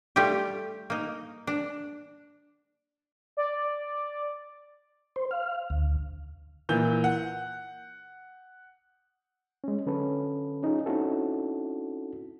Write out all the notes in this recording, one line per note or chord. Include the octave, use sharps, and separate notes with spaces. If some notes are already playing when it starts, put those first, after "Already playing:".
G3 A3 F4 G4
A#3 D#4
D4
D5
C5
F5
D2
A#2 E3 G6
F#5
G#3 C#4
D3 F#3 C#4 A4 B4
C#4 D#4 F4 G#4
C4 C#4 D#4 E4 F#4 A4